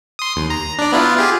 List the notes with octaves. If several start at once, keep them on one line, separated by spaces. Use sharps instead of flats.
C6 D#6
D#2
A#5
D4 D5
B3 E4 F4
F4 G4 G#4